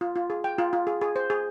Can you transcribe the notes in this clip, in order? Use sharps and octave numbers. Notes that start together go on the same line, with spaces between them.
F4
F4
G#4
G5
F4
F4
G#4
G#4
C5
G#4